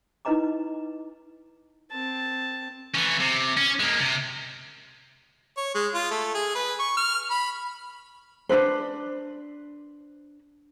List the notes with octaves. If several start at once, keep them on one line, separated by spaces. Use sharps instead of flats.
D#4 E4 B4 D#5 A#5 D6
C4 A5
E3 C#4
C3
C#4
G#3 A#3
C3
C#5
G#3
F4
A3
G#4
B4
C#6
F6
B5
D4 D#4 B4 C5